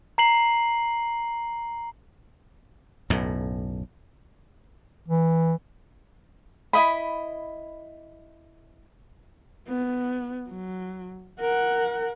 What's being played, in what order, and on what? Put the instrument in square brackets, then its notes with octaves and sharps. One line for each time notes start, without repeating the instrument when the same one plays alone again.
[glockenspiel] A#5 C7 F#7
[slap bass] B1 F#2 A2
[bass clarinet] E3
[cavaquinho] E4 D#5 B5
[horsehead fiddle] B3
F#3
A#4 F#5